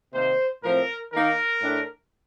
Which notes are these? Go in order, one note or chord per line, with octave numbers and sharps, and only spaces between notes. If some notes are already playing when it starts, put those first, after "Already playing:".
C3 D#3 A#3 C5
A2 F3 C4 A#4
D#3 A#3 D#4 A#4
A2 A3 D4